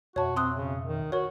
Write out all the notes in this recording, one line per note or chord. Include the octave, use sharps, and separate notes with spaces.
F2 B2 F#4 C#5 E5 A5
C4 C6 D#6 F#6
C#3
D#3
F#4 A#4 C#5